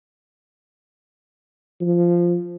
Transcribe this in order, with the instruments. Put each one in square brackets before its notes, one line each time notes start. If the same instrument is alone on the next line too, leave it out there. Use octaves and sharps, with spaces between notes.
[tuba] F3